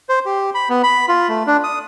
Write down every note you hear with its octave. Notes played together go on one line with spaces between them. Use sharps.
C5
G4
B5
B3
B5
F4
A3
D4
D#6